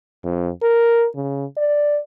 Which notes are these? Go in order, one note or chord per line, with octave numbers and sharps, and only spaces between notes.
F2
A#4
C#3
D5